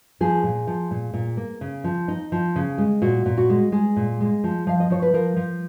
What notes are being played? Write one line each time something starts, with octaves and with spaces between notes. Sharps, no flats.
F3 G#4
A#2
F3
A#2
A#2
A#3
C#3
F3
D#4
F3
C#3
G#3
A#2 F#4
A#2
F#4
G#3
G#3 G#4
A#2
G#3
F3
F3 F5
D#5
F3 C#5
B4
F3 A#4
F3